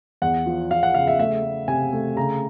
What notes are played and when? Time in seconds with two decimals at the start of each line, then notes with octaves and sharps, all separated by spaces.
0.22 E2 F#5
0.46 F3
0.71 F3 F5
0.83 F#5
0.94 C#3 F5
1.07 E5
1.19 A3 E5
1.43 A3
1.68 C3 G#5
1.93 A3
2.16 C#3 A#5